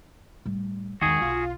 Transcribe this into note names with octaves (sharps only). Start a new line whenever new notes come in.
A2 G3
E2 D#3 G#3 F#4 G#4
B1 F4